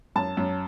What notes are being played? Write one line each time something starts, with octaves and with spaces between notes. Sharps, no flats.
F#2 A5
F#2